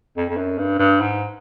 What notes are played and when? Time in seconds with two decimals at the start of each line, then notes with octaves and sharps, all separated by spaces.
0.17 F2
0.30 F2
0.37 F#2
0.58 G2
0.79 G2
1.01 G#2